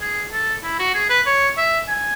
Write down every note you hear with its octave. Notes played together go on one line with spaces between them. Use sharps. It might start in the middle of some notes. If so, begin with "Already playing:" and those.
G#4
A4
E4
F#4
G#4
B4
C#5
E5
G#5